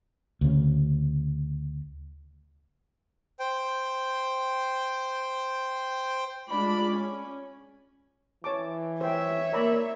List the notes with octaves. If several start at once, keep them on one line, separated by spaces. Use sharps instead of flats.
D2 C#3
C5 G5
G#3 D4 F4 D5 B5
C#4
E3 C#5 A5 D6
C5 C#5 E5 G5
A#3 A#4 D5 A#5 B5